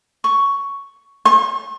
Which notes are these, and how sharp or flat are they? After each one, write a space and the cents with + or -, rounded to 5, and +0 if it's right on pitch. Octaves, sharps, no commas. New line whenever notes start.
C#6 +5
C#6 -45